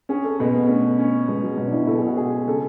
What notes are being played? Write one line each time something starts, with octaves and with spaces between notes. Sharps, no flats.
C#4 G#4
A4
B2 G#4
B3
A3 C#4
C#4
B2 G#3
F#3
B2
D4
E4
B2 A4
G#4
F#4
G#3 G#4
C#3 A4